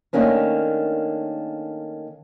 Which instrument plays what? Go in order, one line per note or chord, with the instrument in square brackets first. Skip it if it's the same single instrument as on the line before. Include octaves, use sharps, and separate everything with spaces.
[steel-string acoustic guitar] D#3 A3 A#3 C#4 D4